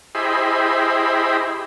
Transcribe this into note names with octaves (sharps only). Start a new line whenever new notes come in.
E4 G4 G#4 C5 D#5 B5